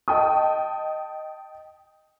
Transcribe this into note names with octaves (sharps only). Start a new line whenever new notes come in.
D#5 G5 A5 D#6